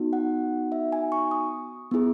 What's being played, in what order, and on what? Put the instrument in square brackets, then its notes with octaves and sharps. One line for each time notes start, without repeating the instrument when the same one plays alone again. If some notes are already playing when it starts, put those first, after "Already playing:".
Already playing: [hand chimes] B3 D#4 F#4
F#5
E5
G#5
C#6
D#6
B3 E4 G#4